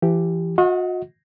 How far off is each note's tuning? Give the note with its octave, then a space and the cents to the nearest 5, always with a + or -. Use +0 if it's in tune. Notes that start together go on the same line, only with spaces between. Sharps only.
E3 +30 G4 +0
F#4 -40 D#5 +30 F#5 +0